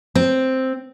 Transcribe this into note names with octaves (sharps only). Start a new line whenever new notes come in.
C4